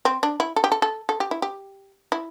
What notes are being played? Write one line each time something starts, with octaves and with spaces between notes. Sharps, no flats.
C4
D4
E4
A4
G4
A4
A4
A4
G4
E4
G4
E4